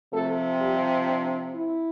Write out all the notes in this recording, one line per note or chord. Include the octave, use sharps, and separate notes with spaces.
C3 F3 A3 C4 A4
G3 G4
D4
E4